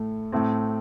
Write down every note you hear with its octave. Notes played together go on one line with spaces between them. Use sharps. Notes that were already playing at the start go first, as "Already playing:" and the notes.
Already playing: A2 A3
A2 A3 C4